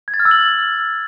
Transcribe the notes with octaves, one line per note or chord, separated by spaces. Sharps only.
G#6
A6
F6
E6
F#7